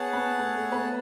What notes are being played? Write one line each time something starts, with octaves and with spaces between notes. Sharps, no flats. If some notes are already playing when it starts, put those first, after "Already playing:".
Already playing: B3 G#4 B4 C#5 F#5 A5
B3 B4
A3 A4
A3 A4
B3 B4